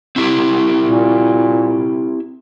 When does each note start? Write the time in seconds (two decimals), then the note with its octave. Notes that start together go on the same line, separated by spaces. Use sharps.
0.16 C4 E4 G4
0.84 A#2